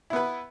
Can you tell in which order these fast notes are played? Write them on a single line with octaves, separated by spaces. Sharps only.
E4 B3 B4